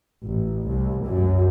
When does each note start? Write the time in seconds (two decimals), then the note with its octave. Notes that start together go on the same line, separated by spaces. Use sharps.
0.23 A1
0.67 C2
1.06 F#2